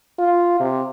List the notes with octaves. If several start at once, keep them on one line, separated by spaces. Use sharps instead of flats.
F4
C3